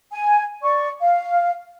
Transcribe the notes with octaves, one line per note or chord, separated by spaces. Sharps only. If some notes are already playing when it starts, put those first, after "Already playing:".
G#5
D5 C#6
F5